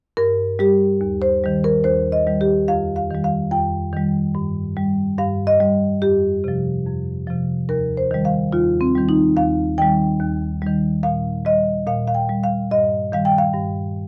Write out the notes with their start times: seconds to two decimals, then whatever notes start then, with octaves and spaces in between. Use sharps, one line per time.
0.17 G2 A#4
0.59 G3 G4
1.01 D#2
1.22 C5
1.44 D#3 G3
1.64 A#4
1.84 D#2 C5
2.12 D#5
2.27 D#3 G3
2.41 G4
2.68 F2 F5
2.96 F5
3.11 D#3 G3
3.24 F5
3.51 F2 G5
3.93 D#3 G3
4.35 G2
4.77 G3
5.18 G2 F5
5.47 D#5
5.61 G3
6.02 F2 G4
6.44 C3 F3
6.87 F2
7.27 C3 F3
7.69 D#2 A#4
7.97 C5
8.11 D#3 G3
8.25 F5
8.52 D#2 F4
8.81 C4
8.95 D#3 G3
9.09 D#4
9.36 D#2 F5
9.78 D#3 G3 G5
10.20 D#2
10.62 D#3 G3
11.03 A#2 F5
11.45 G3 D#5
11.87 A#2 F5
12.08 F5
12.15 G5
12.29 G3
12.44 F5
12.71 G2 D#5
13.12 D#3 G3 F5
13.25 G5
13.38 F5
13.54 G2